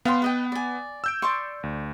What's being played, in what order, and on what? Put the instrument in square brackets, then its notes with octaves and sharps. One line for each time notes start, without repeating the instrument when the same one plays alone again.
[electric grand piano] B3 [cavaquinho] F5 G5 C6
[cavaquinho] B4 D#5 G5
D5 G#5
[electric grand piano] E6 G6 D7
[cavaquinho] D5 C6 C#6
[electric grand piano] D2